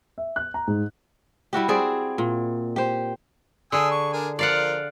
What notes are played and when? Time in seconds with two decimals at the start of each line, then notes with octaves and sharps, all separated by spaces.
0.18 E5
0.36 F#6
0.54 A#5
0.67 G#2
1.53 G3 E4 F#4 G4
1.68 C4 G#4 D5
2.18 A#2
2.76 G4 C5
3.72 D3 G#4 G#5 D#6 E6
3.91 C#6
4.13 D4 A#4 G#5
4.39 F3 F4 A#4 D5 F5 F#5